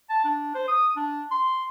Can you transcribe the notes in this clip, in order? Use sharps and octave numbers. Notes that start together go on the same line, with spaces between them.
A5
D4
C5
D#6
D4
C6